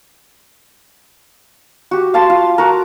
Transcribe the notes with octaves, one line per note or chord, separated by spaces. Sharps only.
F#4 G4
F5 A5 C6
F4
F#4 A#4